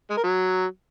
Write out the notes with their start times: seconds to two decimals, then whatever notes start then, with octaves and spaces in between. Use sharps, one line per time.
0.10 G#3
0.17 A#4
0.24 F#3